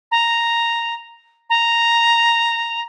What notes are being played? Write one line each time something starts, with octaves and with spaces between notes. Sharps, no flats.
A#5
A#5